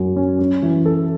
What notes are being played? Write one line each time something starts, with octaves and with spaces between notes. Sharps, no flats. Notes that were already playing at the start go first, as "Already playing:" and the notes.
Already playing: F#2 F#3
C#4
C#4
E3
A4